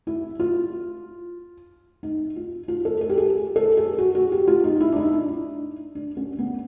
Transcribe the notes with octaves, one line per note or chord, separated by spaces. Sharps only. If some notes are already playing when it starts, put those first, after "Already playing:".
E4
F4
D#4
F4
F4
A4
A4
G4
G#4
A4
G#4
F#4
F#4
G4
F4
D#4
E4
D4
D#4
D4
D4
C#4
B3